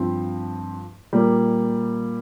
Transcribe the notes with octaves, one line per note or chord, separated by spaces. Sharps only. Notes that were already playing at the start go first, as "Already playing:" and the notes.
Already playing: G2 F3 C4
A#2 G3 A#3